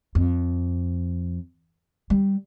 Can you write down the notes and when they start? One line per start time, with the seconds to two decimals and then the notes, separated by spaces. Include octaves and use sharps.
0.15 F2
2.10 G3